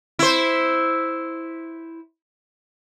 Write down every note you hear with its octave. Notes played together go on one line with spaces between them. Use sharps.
E4 C5